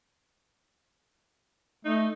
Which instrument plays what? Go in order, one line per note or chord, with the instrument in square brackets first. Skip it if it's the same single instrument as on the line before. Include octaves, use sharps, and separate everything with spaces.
[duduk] A3 [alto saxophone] D#4